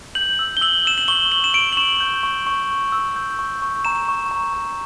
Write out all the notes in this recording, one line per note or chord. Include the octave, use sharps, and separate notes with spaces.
G6 F#7
E6
G7
E6 F#7
E6 E7
F#7
C#6 G7
E6 F#7
E7
C#6 D7
F#7
C#6 E7
G6
C#6
C#6
C#6
E6
G6
C#6
C#6
A#5 E7
C#6
A#5
A#5